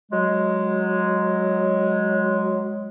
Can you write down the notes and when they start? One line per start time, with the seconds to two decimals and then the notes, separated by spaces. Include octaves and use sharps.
0.12 F#3 G#3